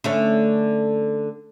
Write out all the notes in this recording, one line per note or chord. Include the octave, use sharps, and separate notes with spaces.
D3 A3 C#4